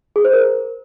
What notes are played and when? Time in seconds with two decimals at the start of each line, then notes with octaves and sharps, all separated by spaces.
0.16 G#4
0.25 C5
0.33 A#4